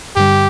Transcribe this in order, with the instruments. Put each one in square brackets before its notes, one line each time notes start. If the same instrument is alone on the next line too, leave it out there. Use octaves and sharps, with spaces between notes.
[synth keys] G2 D3 G3 [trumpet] G4